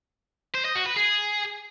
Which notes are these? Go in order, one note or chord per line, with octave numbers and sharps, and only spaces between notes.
C5
D#5
F#4
B4
G#4